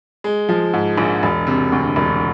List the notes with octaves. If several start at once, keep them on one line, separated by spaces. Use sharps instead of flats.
G#3
F3
G#2
A#1
E1
C3
D2
E1